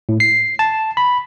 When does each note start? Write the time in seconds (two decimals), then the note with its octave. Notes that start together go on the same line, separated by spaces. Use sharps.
0.09 A2
0.20 C7
0.59 A5
0.97 B5